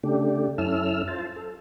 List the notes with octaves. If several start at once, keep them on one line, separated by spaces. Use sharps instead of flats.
C#3 A3 D4 G4
F#2 C#4 E4 A4 E6 F6
F4 C5 A5
A4